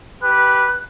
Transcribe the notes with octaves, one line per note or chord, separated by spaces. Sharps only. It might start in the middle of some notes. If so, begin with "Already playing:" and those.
G4 B4 F#6